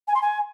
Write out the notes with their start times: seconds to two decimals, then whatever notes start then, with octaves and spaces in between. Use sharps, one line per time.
0.08 G#5
0.15 C6
0.22 G#5